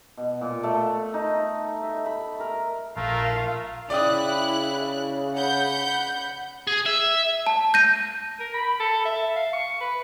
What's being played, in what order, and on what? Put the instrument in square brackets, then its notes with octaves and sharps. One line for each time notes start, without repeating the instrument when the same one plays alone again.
[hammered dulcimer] B2
A#2
A3
D#4
E5
B5
A#4
[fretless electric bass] A#1 [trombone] A3 [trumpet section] F4 A#4 [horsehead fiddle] F5
[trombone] C#3 [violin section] E4 F#6 [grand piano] D5 G5 D#6
[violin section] F#5 B5 G6
[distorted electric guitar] G#4
E5
[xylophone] A5
G6 A#6 D#7
[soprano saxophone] A#4
B5
A4
E5
F5
C#6
B4